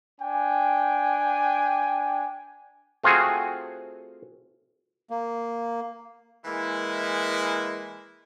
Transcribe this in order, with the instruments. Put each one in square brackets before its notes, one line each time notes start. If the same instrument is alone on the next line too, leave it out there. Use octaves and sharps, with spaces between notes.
[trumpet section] D4 G5 G#5
[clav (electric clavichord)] A3 C4 F4 F#4 G#4
[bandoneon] A#3
[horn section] E3 G#3 A#3 E4